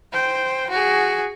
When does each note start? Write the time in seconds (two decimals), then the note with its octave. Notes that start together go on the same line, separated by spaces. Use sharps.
0.12 C5 G5
0.70 F#4 G#4